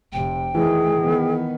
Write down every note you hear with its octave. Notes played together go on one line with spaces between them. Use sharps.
F1 C3 G5
D#3 E3 A3 G#4
D#3 B3